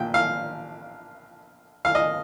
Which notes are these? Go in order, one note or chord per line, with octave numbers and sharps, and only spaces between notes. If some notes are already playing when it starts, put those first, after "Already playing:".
Already playing: A#1 A#2 G5
F5
F5
D#5